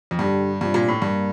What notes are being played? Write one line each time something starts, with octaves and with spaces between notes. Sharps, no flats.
F2
G2 D3 G3 D4 G4
G2 C3 G3 D4 F4
A#2
A2
G2 A#3